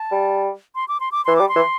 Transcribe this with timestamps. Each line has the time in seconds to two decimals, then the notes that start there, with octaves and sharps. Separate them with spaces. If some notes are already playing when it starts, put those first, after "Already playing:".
Already playing: A5
0.11 G3
0.75 C6
0.88 D6
1.00 C6
1.12 D6
1.25 E3 C6
1.36 G3 D6
1.49 C6
1.56 E3